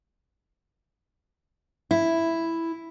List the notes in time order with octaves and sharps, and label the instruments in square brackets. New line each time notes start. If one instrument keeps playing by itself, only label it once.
[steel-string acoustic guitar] E4